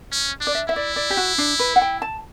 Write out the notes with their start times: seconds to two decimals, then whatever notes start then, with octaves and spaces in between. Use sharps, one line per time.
0.12 C#4
0.41 D4
0.47 D5
0.55 E5
0.68 E4 E5
0.76 D5
0.96 D5
1.10 G4
1.17 F#4
1.38 D4
1.59 B4
1.76 F#5
1.82 G5
2.02 A5